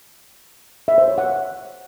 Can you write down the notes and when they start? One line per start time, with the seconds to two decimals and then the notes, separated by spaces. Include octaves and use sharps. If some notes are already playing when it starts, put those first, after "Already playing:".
0.88 E5
0.98 C5
1.08 C#5
1.18 F#5